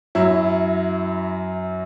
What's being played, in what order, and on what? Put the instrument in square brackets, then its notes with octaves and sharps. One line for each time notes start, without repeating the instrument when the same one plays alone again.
[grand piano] F#2 F#3 E4